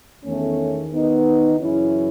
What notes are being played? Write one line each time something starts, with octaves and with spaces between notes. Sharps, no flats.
E2 D#3 A3 C#4
B3 D#4
F#2 C#3 E3 C#4 E4